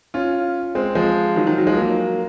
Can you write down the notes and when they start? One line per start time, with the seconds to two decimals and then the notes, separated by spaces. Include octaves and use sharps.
0.14 C#4 F4
0.75 G#3 C4
0.95 F3 G#3
1.36 D#3 F#3
1.47 D#3 F#3
1.58 F#3
1.67 F3 G#3
1.77 F#3 A#3